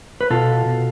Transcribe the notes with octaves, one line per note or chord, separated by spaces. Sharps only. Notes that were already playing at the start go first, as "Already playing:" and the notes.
B4
B2 F4 A4
B2